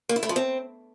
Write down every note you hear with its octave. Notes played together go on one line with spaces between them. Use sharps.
A#3
E4
A3
F3
C4